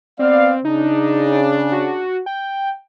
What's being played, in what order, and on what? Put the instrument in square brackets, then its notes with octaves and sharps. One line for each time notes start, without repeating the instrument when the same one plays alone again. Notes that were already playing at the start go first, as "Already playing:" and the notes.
[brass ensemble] B3 D5 F5 [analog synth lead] C4
[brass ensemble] C#3 D4 [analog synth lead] D#4
[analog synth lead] F#4
G5